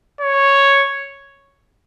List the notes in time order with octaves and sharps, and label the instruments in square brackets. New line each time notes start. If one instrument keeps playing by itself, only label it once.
[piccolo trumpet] C#5